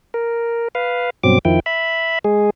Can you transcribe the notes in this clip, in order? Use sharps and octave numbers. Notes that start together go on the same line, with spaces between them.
A#4
B4 F5
G2 B2 F#3 C4 D6
F2 D#3 F3 E4 G5
E5 B5
G#3 G#4